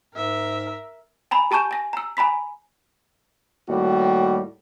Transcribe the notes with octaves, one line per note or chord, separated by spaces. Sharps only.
G#2 A#4 E5
G#5 A#5 B5
G4 G#5 A5 C#6 G6 E7
G#5 A#6
A#5 E6
G#5 A#5 B5 B6
D#2 A2 G3 F#4